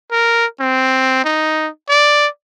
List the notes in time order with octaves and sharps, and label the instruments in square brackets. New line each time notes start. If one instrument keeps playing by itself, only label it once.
[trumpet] A#4
C4
D#4
D5